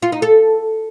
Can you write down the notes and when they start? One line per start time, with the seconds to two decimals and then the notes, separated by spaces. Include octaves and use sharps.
0.02 F4
0.12 D#4
0.22 A4